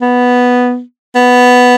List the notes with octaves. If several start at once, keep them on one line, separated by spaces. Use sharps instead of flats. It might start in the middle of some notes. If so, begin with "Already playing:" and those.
B3
B3